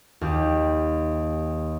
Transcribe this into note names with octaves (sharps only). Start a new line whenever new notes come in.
D#2 G4